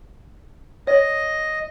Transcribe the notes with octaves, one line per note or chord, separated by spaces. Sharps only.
C#5 D#5